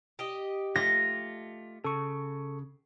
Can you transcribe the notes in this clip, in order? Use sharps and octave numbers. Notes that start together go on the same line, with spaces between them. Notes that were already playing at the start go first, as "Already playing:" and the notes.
G4 D#5
A3 F4 A#6
C#3 A4 C#6